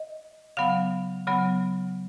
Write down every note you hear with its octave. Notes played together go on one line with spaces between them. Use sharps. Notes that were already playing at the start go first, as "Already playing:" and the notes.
Already playing: D#5
C#3 F#3 B3 F5
C#3 F#3 B3